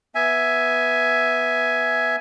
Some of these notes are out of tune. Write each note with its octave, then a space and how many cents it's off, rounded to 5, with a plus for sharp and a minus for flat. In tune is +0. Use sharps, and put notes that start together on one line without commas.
B3 +0 E5 +0 G#5 +10